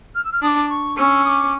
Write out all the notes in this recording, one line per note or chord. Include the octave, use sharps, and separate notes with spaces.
F6
E6
F6
D4 D6 D#6
C#6
C#4 E6
D#6
D6